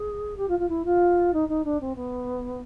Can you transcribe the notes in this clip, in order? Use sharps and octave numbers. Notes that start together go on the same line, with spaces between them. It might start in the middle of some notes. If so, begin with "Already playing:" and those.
Already playing: G#4
G4
F4
F4
E4
F4
D#4
D#4
D4
C4
B3